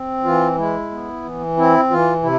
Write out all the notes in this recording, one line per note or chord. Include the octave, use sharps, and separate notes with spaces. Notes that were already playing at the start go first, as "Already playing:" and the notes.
Already playing: C4
E3 F4
G#3 E4
B3
E3
C4 E4
E3 F4
C3 E4